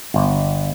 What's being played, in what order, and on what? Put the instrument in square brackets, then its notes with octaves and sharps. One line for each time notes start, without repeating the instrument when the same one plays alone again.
[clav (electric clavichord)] G1